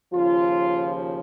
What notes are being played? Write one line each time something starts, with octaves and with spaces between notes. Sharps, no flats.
D#2 C#3 F3 F4